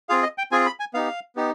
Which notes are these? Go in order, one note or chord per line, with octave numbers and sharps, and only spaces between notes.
C4 F4 G#4 F5
D#5
G5
C4 F4 G#4 G#5
B5
G#5
B3 D#4 G4 F5
B3 D#4 G4